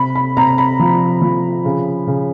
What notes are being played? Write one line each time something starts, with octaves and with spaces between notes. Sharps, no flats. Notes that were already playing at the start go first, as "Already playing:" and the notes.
Already playing: C3 B5
B5
C3 A#5
B5
F3
F3
C#3
C#3